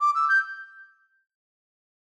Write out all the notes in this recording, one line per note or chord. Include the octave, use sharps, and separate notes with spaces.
D6
E6
G6